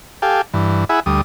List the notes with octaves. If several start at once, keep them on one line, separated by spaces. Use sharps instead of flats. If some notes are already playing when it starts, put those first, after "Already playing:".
G4 A4 F5 G5 G#5
G2 E3
E4 G#4 E5 F#5 G#5 B5
D2 G3 D#6